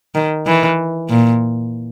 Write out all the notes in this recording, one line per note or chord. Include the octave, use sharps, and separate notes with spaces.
D#3
E3
A#2